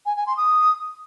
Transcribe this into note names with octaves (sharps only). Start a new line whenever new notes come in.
G#5
G#5
C6
D#6